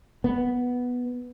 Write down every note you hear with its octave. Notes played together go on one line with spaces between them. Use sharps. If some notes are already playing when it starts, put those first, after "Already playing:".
B3